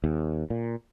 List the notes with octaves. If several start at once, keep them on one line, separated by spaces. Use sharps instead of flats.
D#2
A#2